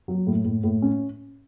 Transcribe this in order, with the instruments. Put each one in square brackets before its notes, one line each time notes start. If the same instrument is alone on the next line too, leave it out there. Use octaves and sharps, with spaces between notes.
[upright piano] F#3
A2
A2
A2
C#4